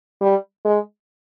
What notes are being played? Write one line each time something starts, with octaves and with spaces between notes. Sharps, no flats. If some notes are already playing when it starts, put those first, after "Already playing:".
G3
G#3